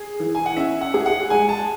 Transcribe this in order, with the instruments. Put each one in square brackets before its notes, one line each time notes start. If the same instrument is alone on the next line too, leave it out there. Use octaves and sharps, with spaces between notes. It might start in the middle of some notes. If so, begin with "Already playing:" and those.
Already playing: [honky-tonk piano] G#4
E3
[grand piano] G#5
F#5
[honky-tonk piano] C#4 [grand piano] E5
[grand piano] F#5
[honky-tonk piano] G#4
[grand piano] F#5
[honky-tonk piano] G#3 [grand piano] G#5
[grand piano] A5